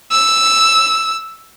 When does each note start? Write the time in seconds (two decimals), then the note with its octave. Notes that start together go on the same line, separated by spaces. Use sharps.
0.11 E6